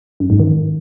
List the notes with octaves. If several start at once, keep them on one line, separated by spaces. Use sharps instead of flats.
F#2
G#2
D#3